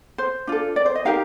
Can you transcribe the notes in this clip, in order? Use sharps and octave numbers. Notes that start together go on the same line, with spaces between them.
C5
D4 F4 A4
D5
C5
D#5
D#4 G4 A#4 F5